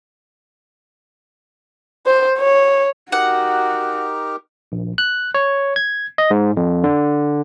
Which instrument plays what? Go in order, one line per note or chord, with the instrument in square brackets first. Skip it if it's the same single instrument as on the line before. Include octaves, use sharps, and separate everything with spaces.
[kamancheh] C5
C#5
[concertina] D#4 G4 A#4 [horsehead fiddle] F#4 [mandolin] F#5
[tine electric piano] A#1
F#6
C#5
G#6
D#5
G#2
F2
D3